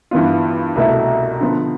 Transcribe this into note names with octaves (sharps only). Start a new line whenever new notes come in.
G2 E3 B3 F4
C2 B2 A3 E4
D3 F3 B3